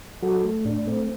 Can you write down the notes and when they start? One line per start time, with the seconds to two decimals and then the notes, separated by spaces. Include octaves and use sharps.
0.22 F#3 F#4 A4
0.44 A3
0.65 A2 D4
0.87 A3 C4